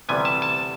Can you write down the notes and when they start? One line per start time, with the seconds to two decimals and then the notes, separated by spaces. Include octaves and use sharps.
0.09 D2 C3 E3 G3 B3 G#5
0.25 A5
0.42 A5